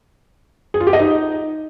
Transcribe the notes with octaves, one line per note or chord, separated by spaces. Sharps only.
G#4
F4
G4
D#5
D#4